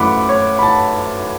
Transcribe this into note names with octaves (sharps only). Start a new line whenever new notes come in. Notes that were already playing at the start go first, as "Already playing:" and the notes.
Already playing: F#2 E3 A3 F#5 B5 D6
C#5
B5
A5